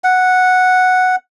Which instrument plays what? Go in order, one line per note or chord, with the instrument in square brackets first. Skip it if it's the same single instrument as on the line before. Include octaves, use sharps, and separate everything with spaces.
[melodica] F#5